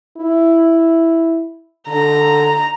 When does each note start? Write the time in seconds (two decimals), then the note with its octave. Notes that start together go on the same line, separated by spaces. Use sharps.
0.17 E4
1.88 D3 A#5